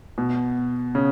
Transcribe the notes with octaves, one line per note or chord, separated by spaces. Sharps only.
B2
C#3